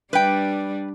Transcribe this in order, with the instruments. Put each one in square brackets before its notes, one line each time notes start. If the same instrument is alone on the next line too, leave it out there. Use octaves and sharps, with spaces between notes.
[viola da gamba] G3 D4 [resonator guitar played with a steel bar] B4 G5